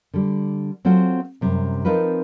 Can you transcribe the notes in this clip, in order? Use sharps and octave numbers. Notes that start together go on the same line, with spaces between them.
D3 G3
F#3 C4 F4 A4 F#5
F#2 C3 G3
F3 C4 D#4 F4 A#4 B4